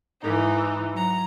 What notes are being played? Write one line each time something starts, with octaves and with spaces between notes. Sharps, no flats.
G#2 E3 D#4
F#3 A#5